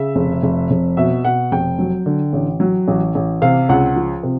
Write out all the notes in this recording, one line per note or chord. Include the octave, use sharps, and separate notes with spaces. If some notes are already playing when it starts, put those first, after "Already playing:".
Already playing: C#3 E5
F1
F1
F1
B2 E5
B2 F#5
F1 G5
F#3
D3
A1
F#3
A1
A1
C3 F5
C#2 F#5
F3
C3